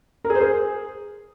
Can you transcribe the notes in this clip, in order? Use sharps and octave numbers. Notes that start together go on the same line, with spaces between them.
A#4
G#4
C5
G#4